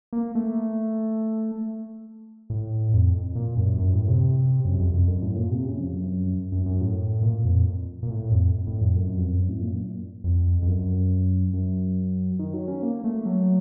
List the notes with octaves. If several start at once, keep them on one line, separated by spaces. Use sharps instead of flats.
A#3
A3
A2
F2
A#2
F#2
F#2
A2
C3
F#2
F2
F2
F#2
A2
A#2
C3
C#3
F2
F#2
F#2
F#2
A2
A#2
F2
A#2
A2
F2
A2
F2
F#2
F2
F#2
A2
A#2
F#2
F2
F2
F#2
F#2
D#3
F#3
C#4
A#3
A3
F#3